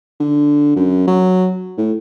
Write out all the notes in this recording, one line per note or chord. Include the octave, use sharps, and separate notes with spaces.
D3
F#2
F#3
A2